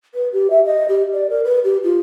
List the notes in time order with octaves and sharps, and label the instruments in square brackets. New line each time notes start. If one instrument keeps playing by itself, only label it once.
[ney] B4
G4
E5
D#5
G4
D5
A#4
B4
G4
F4